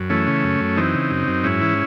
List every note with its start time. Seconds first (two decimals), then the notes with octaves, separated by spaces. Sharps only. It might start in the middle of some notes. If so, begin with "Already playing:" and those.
Already playing: F#2
0.10 E3 A3 C#4
0.27 C#3
0.43 F#2
0.61 F#2
0.77 E3 C4 D#4
0.94 C#3
1.11 F#2
1.28 F#2
1.44 G#2 C#4 E4
1.61 E3